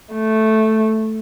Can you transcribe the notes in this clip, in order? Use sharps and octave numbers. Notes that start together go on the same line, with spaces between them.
A3